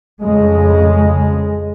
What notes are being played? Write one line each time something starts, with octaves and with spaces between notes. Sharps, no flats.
F2 C#3 G#3